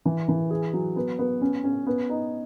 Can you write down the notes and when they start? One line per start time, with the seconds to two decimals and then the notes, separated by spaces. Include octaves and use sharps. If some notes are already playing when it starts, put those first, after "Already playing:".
0.05 E3
0.28 E3
0.50 G#4
0.73 F#3
0.96 B3
1.19 B3
1.41 C#4
1.64 C#4
1.86 B3
2.09 D#4